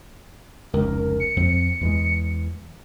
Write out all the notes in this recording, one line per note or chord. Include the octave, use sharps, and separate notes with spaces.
F1 C#2 A#4
C#7
F2 C4
E2 E3 G#3